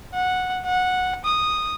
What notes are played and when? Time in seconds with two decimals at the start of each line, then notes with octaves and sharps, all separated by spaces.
0.14 F#5
0.65 F#5
1.25 D#6